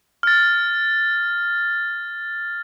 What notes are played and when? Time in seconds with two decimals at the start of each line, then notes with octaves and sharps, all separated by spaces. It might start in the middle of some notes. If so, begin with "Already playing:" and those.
0.23 F6 A6